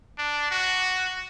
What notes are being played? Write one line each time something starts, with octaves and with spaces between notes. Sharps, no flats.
D4
F#4